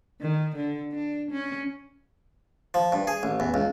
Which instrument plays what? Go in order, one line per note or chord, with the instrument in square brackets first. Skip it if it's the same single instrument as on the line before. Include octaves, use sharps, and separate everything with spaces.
[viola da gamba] D#3
D3
D4
C#4
[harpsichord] F3
G2
G#4
A1
E2
C#2